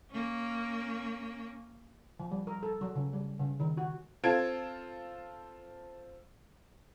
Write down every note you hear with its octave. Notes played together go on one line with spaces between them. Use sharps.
A#3 C#4
F3
G3
A#4
A4
F#3
C#3
G3
C#3
D#3
F#4
C4 F4 A4 G#6 D7